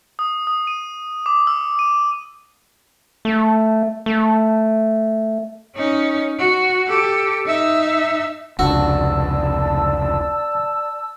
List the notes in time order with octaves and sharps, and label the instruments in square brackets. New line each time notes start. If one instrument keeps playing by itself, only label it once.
[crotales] D#6
D#6
D#7
D6
E6
D#7
[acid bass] A3
A3
[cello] C#4 D#4
F#4
G4 A4
D#4 E5
[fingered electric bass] F1 C#2 D4 [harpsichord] F#4 [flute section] D5 A5 [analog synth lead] E6